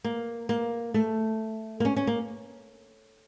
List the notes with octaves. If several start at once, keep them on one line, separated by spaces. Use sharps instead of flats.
A#3
A#3
A3
A#3
C#4
C#4
A#3